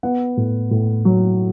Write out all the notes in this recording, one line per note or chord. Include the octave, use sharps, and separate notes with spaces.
B3 F#5
A2
A2
F#3